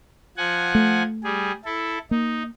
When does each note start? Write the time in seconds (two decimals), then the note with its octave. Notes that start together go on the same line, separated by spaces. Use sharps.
0.37 F3 F#5 G#5
0.75 A3
1.24 G3 G#4
1.65 E4 A4
2.11 A#3 D#4